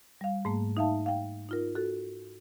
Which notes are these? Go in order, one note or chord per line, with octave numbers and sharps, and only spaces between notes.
G3 F5
G#2 A3 A#3
D#4 E5 F5 A5
F5 G5
D#4 F4 A#4
F#4 A4